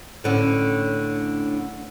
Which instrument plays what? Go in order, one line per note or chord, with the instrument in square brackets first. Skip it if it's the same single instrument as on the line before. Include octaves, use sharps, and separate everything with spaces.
[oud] A2 D3 C#4